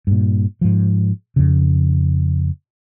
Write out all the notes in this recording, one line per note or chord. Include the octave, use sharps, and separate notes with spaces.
G2 A#2
G#2 F3
F2 C#3